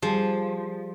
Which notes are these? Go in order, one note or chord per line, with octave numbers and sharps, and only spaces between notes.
F3 G3 G#4